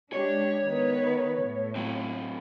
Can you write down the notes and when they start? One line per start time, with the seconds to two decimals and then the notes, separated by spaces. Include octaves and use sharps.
0.13 G#3 D4 G4 C#5
0.62 D#3 B3 B4
1.41 A2
1.76 F#3 C4